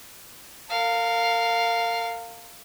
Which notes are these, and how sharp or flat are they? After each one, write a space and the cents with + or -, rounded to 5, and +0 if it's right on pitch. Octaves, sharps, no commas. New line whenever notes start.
A#4 -35 F5 +0